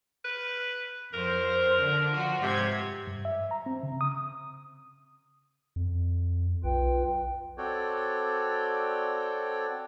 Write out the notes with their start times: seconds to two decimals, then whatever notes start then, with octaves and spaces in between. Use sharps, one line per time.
0.25 B4
1.14 F2 A#4 C5
1.81 D3 D4
2.13 F3 F4 F#4
2.43 G#2 C3 G#6
3.07 G2
3.25 E5
3.51 A#5
3.66 C4
3.83 C#3
4.01 D#6
5.76 F2
6.64 B1 F4 B4 G5
7.58 C4 F#4 A4 C#5 D5 G5